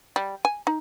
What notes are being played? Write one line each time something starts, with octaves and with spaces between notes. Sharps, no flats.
G3
G#5
D#4